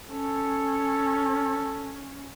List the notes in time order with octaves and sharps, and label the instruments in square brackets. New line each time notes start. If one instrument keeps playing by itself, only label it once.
[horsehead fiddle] C#4 [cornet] A4